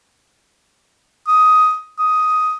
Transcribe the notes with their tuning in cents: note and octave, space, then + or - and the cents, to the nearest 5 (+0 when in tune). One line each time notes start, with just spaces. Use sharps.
D#6 +10
D#6 +10